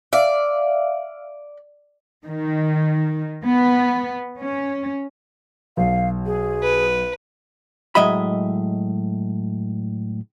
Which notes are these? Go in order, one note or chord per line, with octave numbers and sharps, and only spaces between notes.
D5 E5 F5
D#3
B3
C#4
B1 F5
G#4
B4
A2 F#3 G#3 D#5 E5 B5